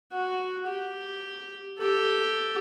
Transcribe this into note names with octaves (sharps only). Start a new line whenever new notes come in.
F#4
G4
G4 A4